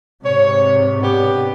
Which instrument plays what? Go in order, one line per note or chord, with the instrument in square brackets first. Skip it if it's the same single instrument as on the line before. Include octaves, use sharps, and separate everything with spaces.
[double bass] G#2 C3 [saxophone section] C#5
[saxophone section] B3 D4 G4